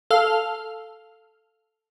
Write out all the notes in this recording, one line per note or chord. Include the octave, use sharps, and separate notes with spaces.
A4 F5 F6